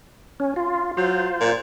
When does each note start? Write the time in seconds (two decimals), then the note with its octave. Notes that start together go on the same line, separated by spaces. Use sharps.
0.40 C#4
0.56 F4
0.97 F#3 F4 C5
1.41 A#2